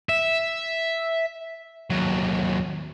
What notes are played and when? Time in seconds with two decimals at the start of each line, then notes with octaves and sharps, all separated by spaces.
0.09 E5
1.90 D#2 F#3